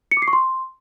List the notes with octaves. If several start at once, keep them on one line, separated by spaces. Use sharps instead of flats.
C#7
D6
C7
C#6
C6